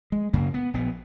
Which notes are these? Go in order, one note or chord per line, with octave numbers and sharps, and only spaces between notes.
G#3
F#2 C#3 A#3
B3
A#1 B3